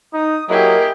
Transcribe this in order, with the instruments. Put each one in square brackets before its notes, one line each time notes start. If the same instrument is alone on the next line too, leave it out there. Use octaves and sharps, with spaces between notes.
[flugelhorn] D#4 [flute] D#6
[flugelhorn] F#3 [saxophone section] A#3 G#4 D#5 [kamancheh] E4 G4 [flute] A#4